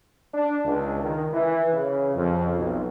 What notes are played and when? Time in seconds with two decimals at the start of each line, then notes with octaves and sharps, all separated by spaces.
0.34 D4
0.65 C#2
1.01 D#3
1.33 E3
1.73 C#3
2.15 F2
2.57 B1